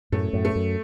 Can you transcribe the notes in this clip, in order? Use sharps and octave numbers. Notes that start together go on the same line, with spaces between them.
F#2 A2 A3
F#2 A2
A3
F#2